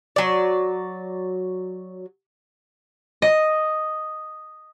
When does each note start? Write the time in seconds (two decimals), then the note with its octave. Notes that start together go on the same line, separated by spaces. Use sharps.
0.16 F#3 D5
3.22 D#5